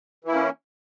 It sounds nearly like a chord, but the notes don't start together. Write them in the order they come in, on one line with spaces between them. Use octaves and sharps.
E3 E4 A#3 C#4